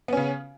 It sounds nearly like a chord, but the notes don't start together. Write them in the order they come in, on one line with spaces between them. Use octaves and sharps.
B3 C#4 C#3